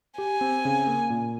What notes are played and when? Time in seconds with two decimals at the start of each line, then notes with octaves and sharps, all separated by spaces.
0.18 G4 G#5
0.41 C4
0.65 C#3
0.87 A#3
1.10 A#2